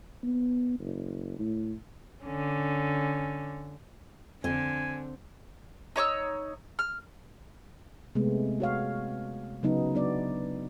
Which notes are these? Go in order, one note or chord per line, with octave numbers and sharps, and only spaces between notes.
B3
F#1
A2
D3 C#4
F2 D3 C4 G#5
D#4 C#5 D6 E6
F6
C3 G#3 A3 B3
F#4 C#5 F5
C#3 F#3 B3 D#4
F#3 B3 D4 D5